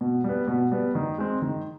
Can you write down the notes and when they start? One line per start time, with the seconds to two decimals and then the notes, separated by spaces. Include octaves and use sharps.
0.01 B2
0.24 G3 B3
0.48 B2
0.71 G3 B3
0.95 D#3
1.18 G#3 C4
1.42 D#3